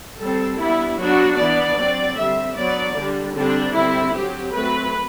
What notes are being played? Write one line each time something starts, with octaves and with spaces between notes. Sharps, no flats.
G3 C4 A4
G3 B3 D4 E4
F#3 B3 D4 F#4
E3 B3 D4 D5
F#3 C4
D3 G3 C4 E5
F#3 B3 D4 D5
D3 G3 D4
D3 G3 C4 D4
D3 G3 C4 E4
F#3 C4 G4
F#3 A3 C4 B4